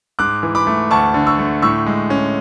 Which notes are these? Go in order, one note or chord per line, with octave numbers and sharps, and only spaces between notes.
G#2 D6 F#6
E3
B5 D6
A3
D2 A5 C#6
D3
C#6 E6
A3
A2 C#6 E6
G#3
C#4